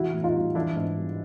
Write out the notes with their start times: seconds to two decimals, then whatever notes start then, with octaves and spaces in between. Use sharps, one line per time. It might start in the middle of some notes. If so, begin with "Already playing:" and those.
Already playing: E3 G#3 E4 F#4
0.13 A2
0.23 D#4 F4
0.34 G3
0.55 E3 D4 E4
0.76 G#2
0.97 G3